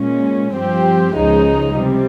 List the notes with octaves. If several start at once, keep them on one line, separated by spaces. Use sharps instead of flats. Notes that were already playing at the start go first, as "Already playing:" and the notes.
Already playing: A#2 G#3 C#4
G2 F3 C4 G4
C#2 C#3 F3 G#3 D#4
C3 G3